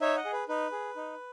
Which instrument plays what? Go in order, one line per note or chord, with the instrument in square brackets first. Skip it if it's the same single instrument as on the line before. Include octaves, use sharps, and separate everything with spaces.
[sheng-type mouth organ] D#4 C#5 E5
D#5 F#5
G#4
B4
D#4 B4
G#4
D#4